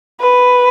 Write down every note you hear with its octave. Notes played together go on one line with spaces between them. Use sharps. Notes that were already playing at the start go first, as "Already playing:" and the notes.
B4